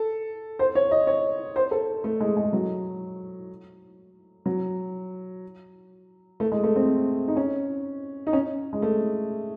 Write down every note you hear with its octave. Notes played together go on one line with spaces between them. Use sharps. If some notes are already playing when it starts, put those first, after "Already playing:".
Already playing: A4
C5
C#5
D#5
C#5
C5
A4
A3
G#3
G#3
F#3
F#3
A3
G#3
A3
C4
D#4
C#4
D#4
C#4
G#3
A3